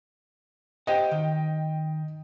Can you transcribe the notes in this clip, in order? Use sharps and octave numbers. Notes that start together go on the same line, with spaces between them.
G4 C5 D#5 F#5 G5
D#3